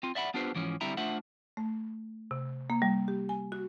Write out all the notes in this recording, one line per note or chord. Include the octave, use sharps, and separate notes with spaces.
C4 F4
D5 E5 F#5 B5
B3 D4 F4 G4 B4 C5
G#2 E3 F3 C#4
D3 G3 C4 E4 E5 A#5
A3 D4 F4 C5 E5 F#5
A3
C3
A#3
G3
G4
G#5
F#4